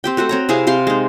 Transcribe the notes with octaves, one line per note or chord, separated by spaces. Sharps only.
C4 G4 G5
A3 F#4 A4 C5
C4 C#5 A#5
C3 E4 G#4 F5
C3 G4 F5 C6
G#3 D#4